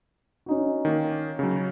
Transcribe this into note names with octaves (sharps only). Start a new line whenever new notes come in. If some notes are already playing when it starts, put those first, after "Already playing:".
C#4 D#4 F#4
D#3 A#3
C#3 F#3